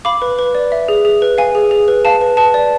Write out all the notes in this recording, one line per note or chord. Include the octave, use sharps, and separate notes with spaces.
F5 B5 D6
B4
B4
D5
E5
G#4
G#4
B4
F5 G#5
G#4
G#4
B4
F5 A5
B4
B4 A5
D5